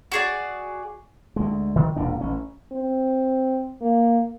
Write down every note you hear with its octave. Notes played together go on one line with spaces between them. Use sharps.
F#4 G#4 D5
D2 G#3
D#3
E1 E2 A#2 D4
A1 C#4
C4
A#3